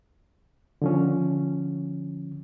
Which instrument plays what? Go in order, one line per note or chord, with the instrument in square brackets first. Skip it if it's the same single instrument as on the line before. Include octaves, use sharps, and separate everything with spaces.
[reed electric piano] D3 F3 C#4